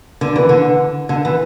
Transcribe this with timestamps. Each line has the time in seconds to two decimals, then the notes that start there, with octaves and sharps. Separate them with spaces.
0.21 D3
0.36 E3
0.49 D3
1.09 D3
1.25 E3